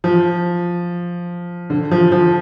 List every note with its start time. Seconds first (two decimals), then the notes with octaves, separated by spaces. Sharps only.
0.04 F3
1.70 D3
1.91 F3
2.12 F3